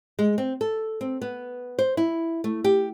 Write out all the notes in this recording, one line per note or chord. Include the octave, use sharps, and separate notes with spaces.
G#3
C4
A4
C4
B3
C5
E4
A3
G4